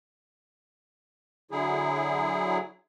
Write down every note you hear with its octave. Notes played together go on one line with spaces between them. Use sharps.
D3 F#3 E4 G#4